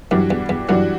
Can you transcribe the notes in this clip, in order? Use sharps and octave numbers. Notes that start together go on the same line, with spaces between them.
F#2 E3 G3 D4 F#4
E2
E2
F#2 E3 G3 D4 F#4